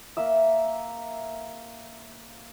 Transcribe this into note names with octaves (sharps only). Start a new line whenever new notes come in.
A#3 E5 E6